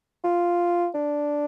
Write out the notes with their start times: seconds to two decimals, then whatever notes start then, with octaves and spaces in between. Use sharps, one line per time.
0.24 F4
0.94 D4